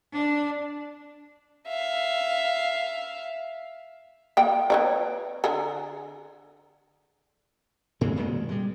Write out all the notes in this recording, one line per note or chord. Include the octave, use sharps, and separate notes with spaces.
D4
E5 F5
A#3 G5
B4 C#5 D5
D3 G#4
G2 A#2 E3 G#3
F#2 A#2 D#3 G#3
G3 G#3